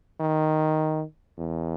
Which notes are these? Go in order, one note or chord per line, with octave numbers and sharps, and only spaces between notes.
D#3
E2